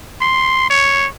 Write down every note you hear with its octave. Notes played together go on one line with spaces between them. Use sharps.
C6
C#5